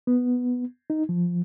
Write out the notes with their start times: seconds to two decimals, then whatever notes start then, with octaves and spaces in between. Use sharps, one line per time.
0.07 B3
0.90 D#4
1.09 F3